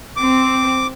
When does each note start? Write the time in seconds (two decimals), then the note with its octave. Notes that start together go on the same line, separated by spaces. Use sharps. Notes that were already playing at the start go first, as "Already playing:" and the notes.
0.17 C4 D6